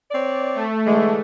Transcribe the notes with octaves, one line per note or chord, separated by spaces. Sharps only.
C4 C#5 D5
A3
D3 E3 G#3